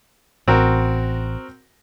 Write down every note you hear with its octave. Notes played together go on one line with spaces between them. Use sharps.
A1 C4 F#4 A#4